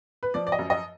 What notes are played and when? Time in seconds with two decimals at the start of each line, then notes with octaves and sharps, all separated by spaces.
0.23 B4
0.34 F3 D5
0.47 D5
0.52 D#5
0.59 F#2
0.70 D#5